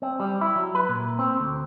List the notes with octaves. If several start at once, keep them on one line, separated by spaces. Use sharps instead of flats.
C4
G3
E4
F#3
B4
A#2
C4
D2